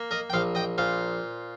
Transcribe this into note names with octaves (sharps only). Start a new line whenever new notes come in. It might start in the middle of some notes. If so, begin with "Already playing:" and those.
Already playing: A#3
A#4 D#5
G5
A#1 C5 F5
D#5 G5
A#2 C5 F5